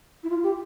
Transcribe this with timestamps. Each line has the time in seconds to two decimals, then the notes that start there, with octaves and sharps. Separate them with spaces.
0.23 E4
0.30 F4
0.43 G4